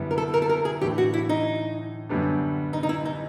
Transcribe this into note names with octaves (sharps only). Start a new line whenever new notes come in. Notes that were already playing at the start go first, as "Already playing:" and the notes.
Already playing: F#2 D3 G3 B3 E4
A#4
A4
A#4
A4
A#4
G#4
A2 E3 A3 D4 G4
F#4
E4
D#4
F#2 D3 G3 B3 D4
D#4
D#4
E4
D#4